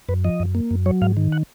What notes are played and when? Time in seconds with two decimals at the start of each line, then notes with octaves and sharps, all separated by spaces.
0.09 F#2 B4
0.24 F3 D#5
0.40 F#2
0.55 A#3
0.71 F#2
0.86 F#3 C#5
1.01 G#2 F5
1.17 D#3
1.32 F#5